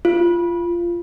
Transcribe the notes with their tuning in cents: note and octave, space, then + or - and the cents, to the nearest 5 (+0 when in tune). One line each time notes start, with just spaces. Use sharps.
F4 -20